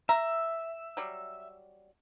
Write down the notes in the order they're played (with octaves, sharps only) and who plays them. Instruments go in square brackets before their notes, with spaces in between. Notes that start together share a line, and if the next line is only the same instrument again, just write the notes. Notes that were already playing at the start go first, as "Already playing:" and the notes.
[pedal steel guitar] E5 [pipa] A#5
[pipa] F#3 G3